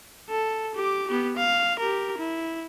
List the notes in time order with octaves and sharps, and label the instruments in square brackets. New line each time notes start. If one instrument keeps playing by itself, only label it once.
[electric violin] A4
G4 D6
B3 G4
F5
G4 A#4
E4